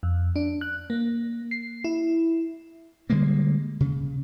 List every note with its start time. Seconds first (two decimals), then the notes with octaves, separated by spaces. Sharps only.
0.03 F2
0.36 D4
0.61 F#6
0.90 A#3
1.51 C7
1.84 E4
3.10 D3 G3 G#3 A#3
3.80 C#3